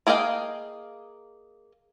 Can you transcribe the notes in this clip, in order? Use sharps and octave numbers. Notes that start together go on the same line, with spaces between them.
A#3 G#4 D#5 F5 G5